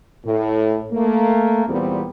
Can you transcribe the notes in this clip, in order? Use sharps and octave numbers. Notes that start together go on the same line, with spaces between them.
A2
A3 A#3
E2 A#2 G3 B3 C4